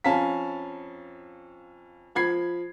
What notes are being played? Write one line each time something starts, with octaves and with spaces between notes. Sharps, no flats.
F2 C#4 F5 A5 A#5 B6
F3 B5 G#6 C7